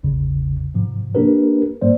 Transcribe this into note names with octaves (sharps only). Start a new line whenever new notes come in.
A1 E2 C#3
G#2 C3 F3
A#3 D4 G4 A#4 B4
G#2 G3 A#3 C5 D5